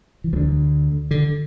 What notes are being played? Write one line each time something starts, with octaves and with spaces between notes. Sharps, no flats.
E3
D2 D3 F3
D3